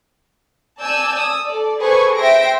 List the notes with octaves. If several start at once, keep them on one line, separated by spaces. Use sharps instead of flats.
D5 G#5 A5 E6 G6
D#6 E6
A4 D5
G#4 A4 B4 C5 G#5 C#6
E5 G5 C6 A#6 D7